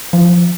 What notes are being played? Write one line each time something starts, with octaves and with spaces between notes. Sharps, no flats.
F3